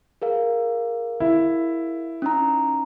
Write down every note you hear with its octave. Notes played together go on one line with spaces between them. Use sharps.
G#4 A#4 F5
E4
C#4 D#4 A#5